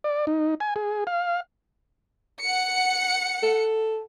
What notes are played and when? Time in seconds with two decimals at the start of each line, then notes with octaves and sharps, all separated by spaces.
0.04 D5
0.27 D#4
0.60 G#5
0.76 G#4
1.07 F5
2.42 F#5 C#7
3.43 A4